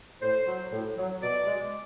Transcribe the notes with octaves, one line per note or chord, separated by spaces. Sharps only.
A2 C5
F#3
A2
F#3
B2 D5
G#3